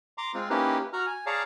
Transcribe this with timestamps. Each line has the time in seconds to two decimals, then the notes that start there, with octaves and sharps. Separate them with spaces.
0.18 A#5 C6 D6
0.34 G#3 C4 F4
0.50 A#3 C#4 D#4 E4 G4 B4
0.93 F#4 A#5 F6
1.06 G#5
1.26 G#4 C#5 D5 F5 A5 A#5